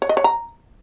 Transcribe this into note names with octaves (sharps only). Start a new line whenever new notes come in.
C#5
D#5
C#5
A#5